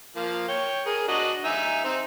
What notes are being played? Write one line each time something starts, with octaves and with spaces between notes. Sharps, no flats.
F3 A#3
C#5 G5
G#4 A#4
D4 F#4 D#5
D#4 E5 G#5
C4 D#4